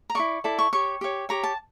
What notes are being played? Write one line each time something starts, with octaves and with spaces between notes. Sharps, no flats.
A#5
E4 A4 D5 C#6
E4 A4 D5
C#6
G4 C#5 C#6
G4 C#5
G4 C#5 A#5
A5